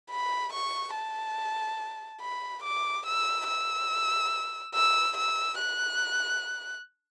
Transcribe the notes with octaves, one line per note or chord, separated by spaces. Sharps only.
B5
C#6
A5
B5
D6
E6
E6
E6
E6
F#6